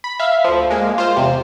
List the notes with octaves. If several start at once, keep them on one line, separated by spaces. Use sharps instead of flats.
B5
E5 F5
D2 F3
G#3 A#3
F4 C5
E2 C3